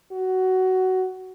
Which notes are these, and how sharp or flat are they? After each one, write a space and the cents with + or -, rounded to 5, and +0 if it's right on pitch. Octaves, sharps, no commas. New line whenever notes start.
F#4 +15